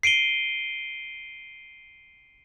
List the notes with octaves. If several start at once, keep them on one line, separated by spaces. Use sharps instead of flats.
C7 D7 D#7 G7